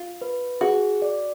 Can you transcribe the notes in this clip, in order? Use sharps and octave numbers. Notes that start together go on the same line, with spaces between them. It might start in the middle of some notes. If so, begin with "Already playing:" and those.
Already playing: F4
B4
F#4 G#4
D5